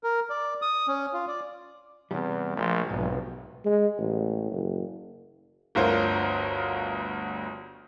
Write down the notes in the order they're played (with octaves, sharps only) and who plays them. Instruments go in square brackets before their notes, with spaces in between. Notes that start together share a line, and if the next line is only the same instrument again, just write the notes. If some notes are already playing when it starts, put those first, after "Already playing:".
[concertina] A#4
D5
D#6
C#4
F4
D5
[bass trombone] E2 [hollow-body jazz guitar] C3 E3 G3
[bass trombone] A#1 [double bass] F3 [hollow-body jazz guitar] A3 B5 C6
[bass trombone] F1 [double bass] B1 [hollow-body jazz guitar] G#2
[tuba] G#3
A1
F#1
[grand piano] G1 D2 F4 A#4 C5 C#5